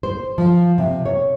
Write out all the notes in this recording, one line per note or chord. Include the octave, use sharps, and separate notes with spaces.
C5
F3
C3
C#5